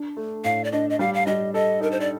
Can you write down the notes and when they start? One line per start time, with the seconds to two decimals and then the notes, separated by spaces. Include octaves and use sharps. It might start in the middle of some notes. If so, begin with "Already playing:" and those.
Already playing: D4
0.17 A3
0.44 A2 F5
0.64 D5
0.72 D4 D#5
0.90 D#5
0.99 G3 F5
1.14 F5
1.27 G3 D#5
1.54 A4 D#5
1.81 D#4 A#4
1.91 C5
2.00 D5